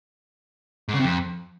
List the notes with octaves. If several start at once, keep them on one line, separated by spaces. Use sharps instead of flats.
G#2
C#3
C3
F2